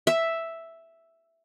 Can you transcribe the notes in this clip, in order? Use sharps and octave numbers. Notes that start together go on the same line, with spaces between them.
E5